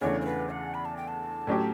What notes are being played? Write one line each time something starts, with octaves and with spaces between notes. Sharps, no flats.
E2 C#3 E3 A3 D4 C#5
C#5
B4
F#5
B5
A5
G5
A5
A2 F#3 C#4 G4